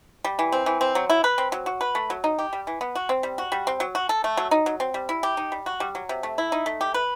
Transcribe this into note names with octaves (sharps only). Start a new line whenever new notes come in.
G3
E3
C4
E3
C4
F#3
E4
B4
C4
F#3
F#4
B4
A3
F#3
D#4
G4
G3
E3
B3
F#4
C4
G3
F#4
G3
C4
F#3
F#4
A4
A3
F#3
D#4
F#3
C4
G3
E4
G4
D#4
G3
F#4
G3
F#3
C3
A3
E4
D#4
A3
G4
B4